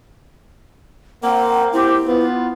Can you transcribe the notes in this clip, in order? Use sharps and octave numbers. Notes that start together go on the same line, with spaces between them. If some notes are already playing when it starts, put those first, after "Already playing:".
A#3 C4 F#5
C4 E4 G4
B3 F4